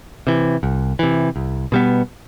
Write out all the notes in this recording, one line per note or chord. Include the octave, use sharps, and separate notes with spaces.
C3 E3
C2
C3 E3
C2
B2 G3 B3